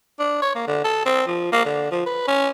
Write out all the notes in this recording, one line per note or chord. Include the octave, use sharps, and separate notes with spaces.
D4
C#5
A#3
D3
A4
C4
F3
A#3
D3
F3
B4
C#4